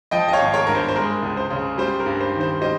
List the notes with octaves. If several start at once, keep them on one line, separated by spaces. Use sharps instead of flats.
F3 D#5 G5
D#5
C#5 F5
G#1
A#4 C#5
G2 A#4
C5
C5
G#3 A#4
C#2
C5
C#3
G3 C5
A#4
G2
C5
D#3
C5
G3 C5 D#5